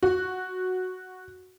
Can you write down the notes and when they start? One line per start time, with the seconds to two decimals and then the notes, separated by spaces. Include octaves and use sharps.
0.03 F#4